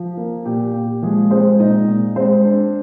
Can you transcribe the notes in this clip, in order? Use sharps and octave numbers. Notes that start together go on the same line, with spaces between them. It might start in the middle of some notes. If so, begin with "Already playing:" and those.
Already playing: F3
A#3
A#2 G4
A#2 G4
F3 G#3 G#4
G#3 C4 C5
A#2 D#4 D#5
A#2
G#3 C4 C5
D4